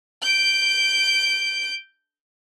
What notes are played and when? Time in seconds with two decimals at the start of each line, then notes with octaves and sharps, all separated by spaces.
0.22 G6 D7